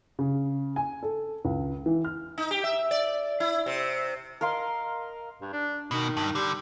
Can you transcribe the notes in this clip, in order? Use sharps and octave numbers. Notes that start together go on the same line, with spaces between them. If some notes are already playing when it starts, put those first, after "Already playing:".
C#3
G#5
A4
C#2
E3
F6
D#4
G4
E5
D5
E4
C3
A#4 D#5 F5 C6
G2
D4
B2 D#3
G2
D3 G3